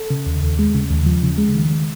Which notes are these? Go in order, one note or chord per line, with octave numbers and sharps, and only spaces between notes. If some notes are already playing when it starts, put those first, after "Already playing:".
Already playing: A4
C#3
D#2
D#2
G#3
C#3
D#2
F3
C#3
G#3
D#3